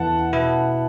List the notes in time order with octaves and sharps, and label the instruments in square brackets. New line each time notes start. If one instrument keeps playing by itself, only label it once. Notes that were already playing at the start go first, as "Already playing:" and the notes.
Already playing: [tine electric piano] E2 E3 B3 E4 [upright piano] F#5 A5
[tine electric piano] B2 B3 E4